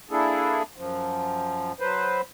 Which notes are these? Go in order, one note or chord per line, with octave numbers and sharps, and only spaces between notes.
A#3 D4 E4 G#4 A4
F#2 F3
F#3 B4 C5